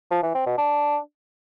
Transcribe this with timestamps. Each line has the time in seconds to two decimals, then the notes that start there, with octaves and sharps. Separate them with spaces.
0.11 F3
0.23 E3
0.35 C4
0.46 B2
0.58 D4